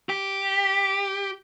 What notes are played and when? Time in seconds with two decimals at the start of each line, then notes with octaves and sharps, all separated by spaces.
0.09 G4